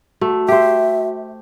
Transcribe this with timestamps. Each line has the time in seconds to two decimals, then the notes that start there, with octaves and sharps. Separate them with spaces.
0.22 A3 F#4
0.48 G4 C5 E5